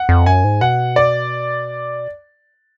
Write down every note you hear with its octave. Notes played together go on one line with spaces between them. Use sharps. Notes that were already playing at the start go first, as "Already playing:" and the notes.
Already playing: F#5
F2
F#2 G#5
G#2
B2 F#5
D5